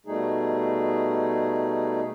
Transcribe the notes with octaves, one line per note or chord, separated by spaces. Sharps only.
B2 G3 A3 D#4 G#4